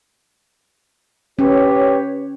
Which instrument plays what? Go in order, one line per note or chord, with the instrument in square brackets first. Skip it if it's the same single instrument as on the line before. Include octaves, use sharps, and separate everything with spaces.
[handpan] C#4 [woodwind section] G4 B4 C#5